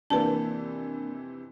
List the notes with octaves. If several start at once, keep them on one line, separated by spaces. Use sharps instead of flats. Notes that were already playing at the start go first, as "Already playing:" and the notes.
F2 C3 E3 A#3 D4 B4 A5